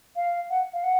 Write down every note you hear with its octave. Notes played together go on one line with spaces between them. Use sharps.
F5
F#5
F5
F#5